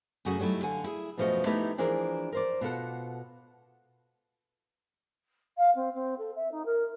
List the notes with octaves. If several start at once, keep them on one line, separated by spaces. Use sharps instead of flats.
F#2 C#3 A3 F#4 G#4
F#3 G3 A3 D#4 E4
D3 F5 F#5 G#5
E4 G#4
F#2 B2 F3 A3 F#4 D#5
A3 B3 D#4 E4 G4 B4
E3 F3 D4 G#4 A#4
A#4 C5 D5
B2 F4 A4 F#5
F5
C4
C4
A4
E5
D#4
A#4